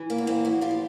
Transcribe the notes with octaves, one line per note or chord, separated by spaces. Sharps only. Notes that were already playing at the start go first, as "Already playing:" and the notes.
Already playing: E3
A#3
E2
A#3 C4
F3 E4 F#4
F4 G4
F3